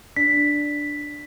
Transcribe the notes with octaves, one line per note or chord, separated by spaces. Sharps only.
D4 B6